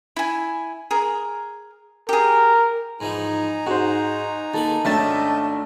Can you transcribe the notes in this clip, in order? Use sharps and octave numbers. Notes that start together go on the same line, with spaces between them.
E4 G#5
G#4 A#4
G4 G#4 A#4
G#2 E3 F3 D#4 G#5 A#5
G#2 F#4 C5
D#2 A#3 A4 B5
G#1 A3 C#4 D4 D#5 E5 A5 G6